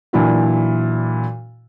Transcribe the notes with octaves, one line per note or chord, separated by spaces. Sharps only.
A#2 E3 F#3 D4 E4 F#4